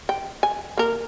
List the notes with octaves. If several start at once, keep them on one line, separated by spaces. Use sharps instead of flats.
G5
G#5
A#3 A#4